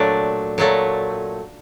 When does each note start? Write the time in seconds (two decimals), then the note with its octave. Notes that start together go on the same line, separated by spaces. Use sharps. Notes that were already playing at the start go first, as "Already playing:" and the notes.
Already playing: A#2 F#3 A3 D4
0.58 A#2 F#3 A3